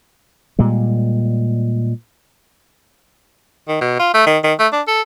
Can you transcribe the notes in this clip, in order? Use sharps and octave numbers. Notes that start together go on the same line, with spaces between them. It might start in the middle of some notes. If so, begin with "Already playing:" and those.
A#2 G3 G#3
D#3
B2
F4
A3
D#3
D#3
A3
D4
A4